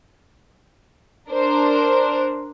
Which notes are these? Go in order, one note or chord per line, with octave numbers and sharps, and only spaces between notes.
D4 A#4 C5